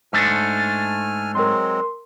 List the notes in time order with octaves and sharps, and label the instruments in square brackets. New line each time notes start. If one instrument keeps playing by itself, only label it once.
[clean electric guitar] G#2 A3 D4 [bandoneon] G#5 F6
[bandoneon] F#3 G#3 C4 [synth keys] A#4 C6